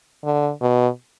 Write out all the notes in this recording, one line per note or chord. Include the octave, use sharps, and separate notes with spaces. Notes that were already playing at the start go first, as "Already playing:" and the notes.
D3
B2